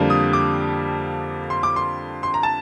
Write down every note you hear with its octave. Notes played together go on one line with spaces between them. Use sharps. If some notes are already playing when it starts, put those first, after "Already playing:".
Already playing: F2 D3 G3 A#3
D#6
D6
C6
D6
C6
C6
A#5
A5